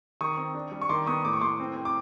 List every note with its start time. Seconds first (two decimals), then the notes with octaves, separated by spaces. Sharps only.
0.21 D#3 C#6 D#6
0.37 C4
0.54 D4
0.72 G3
0.82 C#6
0.89 D#3 C6 D6
1.06 B3 C#6 D#6
1.25 A2 D6
1.33 C#6
1.41 A2 C6 D6
1.60 C4
1.77 C4
1.85 D6